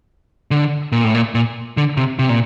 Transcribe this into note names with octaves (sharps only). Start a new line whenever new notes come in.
D3
A#2
A2
A#2
A#2
D3
C3
C3
A#2